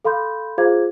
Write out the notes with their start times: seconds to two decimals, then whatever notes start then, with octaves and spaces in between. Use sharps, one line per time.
0.05 A4 F5 B5 C6 G6
0.58 F4 G#4 C5 F5 D6 G#6